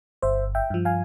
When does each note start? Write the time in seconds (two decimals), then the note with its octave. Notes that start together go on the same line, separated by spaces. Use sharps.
0.22 G1 C5 E5
0.55 E5 G5
0.70 G2 F3
0.85 F5 G#5